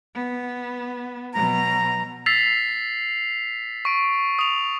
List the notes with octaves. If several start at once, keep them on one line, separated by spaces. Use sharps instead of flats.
B3
B2 F#3 A#5
E6 A6 B6 C7 F7
C#6 D7
D#6 F7